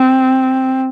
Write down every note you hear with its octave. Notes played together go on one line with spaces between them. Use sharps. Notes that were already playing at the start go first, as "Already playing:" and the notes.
Already playing: C4